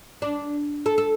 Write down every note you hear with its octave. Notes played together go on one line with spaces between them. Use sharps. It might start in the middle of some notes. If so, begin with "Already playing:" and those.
D4
A4
A4